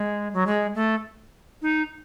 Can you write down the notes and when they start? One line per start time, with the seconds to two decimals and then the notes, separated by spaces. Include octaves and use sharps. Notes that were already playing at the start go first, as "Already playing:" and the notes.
Already playing: G#3
0.34 F#3
0.47 G#3
0.75 A3
1.62 D#4